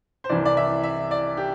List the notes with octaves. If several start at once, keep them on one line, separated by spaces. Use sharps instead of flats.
C5
C2 C3 E3 D5
D5
E5
E5
D5
G4